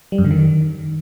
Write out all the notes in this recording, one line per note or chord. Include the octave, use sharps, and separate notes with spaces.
G3
F#2
D3
D#3